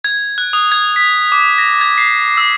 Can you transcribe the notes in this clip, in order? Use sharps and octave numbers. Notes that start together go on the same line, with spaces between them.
G#6
F#6
D#6
G#6
B6
D6
A#6
G#6
C7
E6